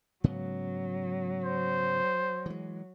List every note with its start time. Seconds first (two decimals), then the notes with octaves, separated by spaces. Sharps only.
0.24 G#2 C#3 F#3 B3
1.44 C5
2.46 E3 G#3